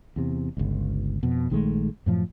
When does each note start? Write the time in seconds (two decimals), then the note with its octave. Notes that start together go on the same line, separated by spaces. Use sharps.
0.16 E2 C3
0.57 G1 C#2
1.23 F2 B2
1.50 A#1 D#3 G#3 A3
2.06 F#2 A2 F3